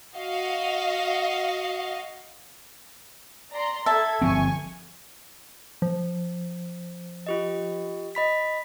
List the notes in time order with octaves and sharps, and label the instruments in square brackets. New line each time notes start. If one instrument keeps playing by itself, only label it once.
[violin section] F#4 D#5 F5
D5 A#5 C6
[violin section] A4 G#6 [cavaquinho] E5 A5
[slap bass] G1 F3 C4 [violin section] G#5 C#6
[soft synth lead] F3
[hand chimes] F4 G4 D#5
D#5 B5 B6